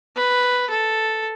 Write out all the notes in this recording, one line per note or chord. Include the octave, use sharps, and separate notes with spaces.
B4
A4